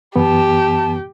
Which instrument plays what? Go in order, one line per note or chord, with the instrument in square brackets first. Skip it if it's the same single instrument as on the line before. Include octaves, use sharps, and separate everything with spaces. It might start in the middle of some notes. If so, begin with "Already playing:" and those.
[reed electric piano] F#2 E3 B3 [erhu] G4 [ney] A5